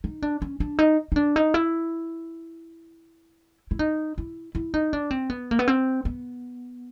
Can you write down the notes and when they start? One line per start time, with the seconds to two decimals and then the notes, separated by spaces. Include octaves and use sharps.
0.04 D#4
0.22 D4
0.42 C#4
0.60 D4
0.79 D#4
1.12 D#4
1.16 D4
1.36 D#4
1.54 E4
3.71 E4
3.79 D#4
4.18 E4
4.55 E4
4.74 D#4
4.93 D4
5.11 C4
5.30 B3
5.51 A#3
5.59 B3
5.68 C4
6.05 B3